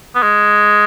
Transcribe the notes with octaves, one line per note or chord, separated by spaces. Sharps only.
B3
G#3